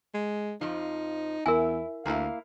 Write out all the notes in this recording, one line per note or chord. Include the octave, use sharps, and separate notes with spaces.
G#3
F2 F3 D#4
E2 E4 A#4 G#5
D2 A#3 E4 F5